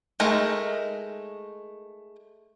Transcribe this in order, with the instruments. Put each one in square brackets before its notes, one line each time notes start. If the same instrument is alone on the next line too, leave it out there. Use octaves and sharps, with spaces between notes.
[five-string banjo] G#3 A3 D#4 A#4